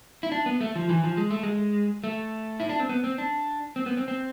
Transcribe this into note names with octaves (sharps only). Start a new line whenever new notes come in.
E4
D4
B3
A3
F3
E3
F3
G#3
A3
G#3
A3
E4
D4
C4
B3
C4
D4
C4
B3
C4
C4